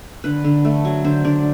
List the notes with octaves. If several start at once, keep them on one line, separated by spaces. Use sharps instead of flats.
D3 B4
D3
A3
F#3
D3 C5
D3 D5